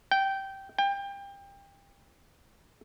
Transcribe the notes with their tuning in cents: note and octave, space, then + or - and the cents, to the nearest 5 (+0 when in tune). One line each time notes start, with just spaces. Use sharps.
G5 -15
G5 +25